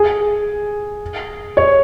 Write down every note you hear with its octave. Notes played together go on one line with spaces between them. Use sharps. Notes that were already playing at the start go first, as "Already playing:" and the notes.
Already playing: G#4
C#5